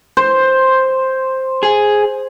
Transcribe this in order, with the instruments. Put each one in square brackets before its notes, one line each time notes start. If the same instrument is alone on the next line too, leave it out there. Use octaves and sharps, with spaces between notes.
[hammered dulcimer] C5
[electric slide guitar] G#4